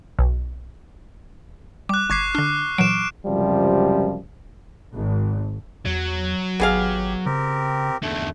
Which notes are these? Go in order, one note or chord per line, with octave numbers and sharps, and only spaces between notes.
B1
G3 D6 F#6
G1 C#6 D6 G#6 B6 C7
D3 D4 F6
A#2 E3 F#3 D7 E7
C#2 F#2 C3 F3 G3
G#1
E2 F#3
G#1 B3 G4 G#4 F5
C#3 C4 G4 A#4
E2 D3 A3